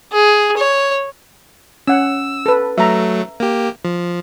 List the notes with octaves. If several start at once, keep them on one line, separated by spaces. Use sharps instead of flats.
G#4
C#5
C#4 F#5 E6
A4 B4
F#3 A3 E5 A#5
A#3 G4
F3